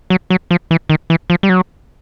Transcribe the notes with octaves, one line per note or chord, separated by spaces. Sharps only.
F#3
F#3
F3
E3
D#3
E3
F3
G3
F#3